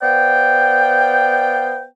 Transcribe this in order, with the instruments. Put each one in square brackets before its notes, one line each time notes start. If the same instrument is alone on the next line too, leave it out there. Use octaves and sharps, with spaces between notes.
[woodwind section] B3 C5 D5 F5 G5